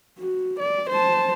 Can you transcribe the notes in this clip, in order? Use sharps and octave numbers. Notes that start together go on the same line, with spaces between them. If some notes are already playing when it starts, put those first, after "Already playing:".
F#4
D5
C5 A5